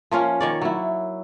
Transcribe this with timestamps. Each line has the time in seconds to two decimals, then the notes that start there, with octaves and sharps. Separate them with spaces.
0.11 F3 A#3 C#4 C#5
0.41 D#3 C#5 D5
0.62 F#3 E4